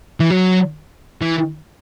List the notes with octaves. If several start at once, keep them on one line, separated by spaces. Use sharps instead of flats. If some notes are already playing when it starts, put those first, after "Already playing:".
E3
F#3
E3